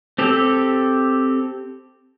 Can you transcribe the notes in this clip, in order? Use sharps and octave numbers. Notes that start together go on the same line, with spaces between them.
C4 G4 A4